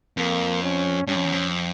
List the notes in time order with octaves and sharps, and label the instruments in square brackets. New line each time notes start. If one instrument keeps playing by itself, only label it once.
[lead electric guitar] F2 [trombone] A#3
[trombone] C#4
[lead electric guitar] G2 [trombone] C#4
[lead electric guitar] F2
E2
F2